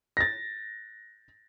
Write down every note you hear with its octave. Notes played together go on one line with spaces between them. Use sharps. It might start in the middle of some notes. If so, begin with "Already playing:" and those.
A6 A#6